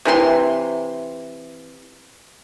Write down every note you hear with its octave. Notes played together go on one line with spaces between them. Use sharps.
C3 E3 C4 C6